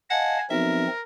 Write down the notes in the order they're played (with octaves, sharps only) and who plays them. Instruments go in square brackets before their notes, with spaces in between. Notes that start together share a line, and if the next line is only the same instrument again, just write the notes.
[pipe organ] D#5 F5 A5 [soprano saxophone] F#5 [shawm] G#5
[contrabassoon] B1 [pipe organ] F3 C4 [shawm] A#4 [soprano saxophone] E5